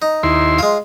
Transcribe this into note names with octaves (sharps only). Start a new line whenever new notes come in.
D#4
D#2 E4 C6
G#3 F4